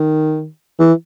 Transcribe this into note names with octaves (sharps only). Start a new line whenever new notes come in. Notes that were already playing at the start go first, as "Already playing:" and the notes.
Already playing: D#3
E3